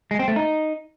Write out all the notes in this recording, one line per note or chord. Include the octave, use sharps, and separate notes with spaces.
G#3
C4
A3
D#4